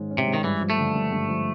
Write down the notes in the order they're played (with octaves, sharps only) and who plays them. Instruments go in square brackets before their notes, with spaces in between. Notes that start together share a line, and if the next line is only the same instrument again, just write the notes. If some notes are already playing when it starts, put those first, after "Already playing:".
Already playing: [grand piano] G#2 D#3 G#3 C#4
C#4
[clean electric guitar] C3
[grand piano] G#3
[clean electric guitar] D#3
[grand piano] G2 [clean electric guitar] E3
[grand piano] F3
[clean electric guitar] A3
[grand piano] D3
G2
G2
F3